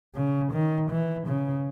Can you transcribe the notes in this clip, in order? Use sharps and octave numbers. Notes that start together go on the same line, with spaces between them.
C#3
D#3
E3
C#3